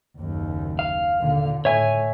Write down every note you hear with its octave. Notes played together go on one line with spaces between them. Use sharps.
F#1 D#2
F5
D#2 A#2 D3
A2 C#5 E5 G#5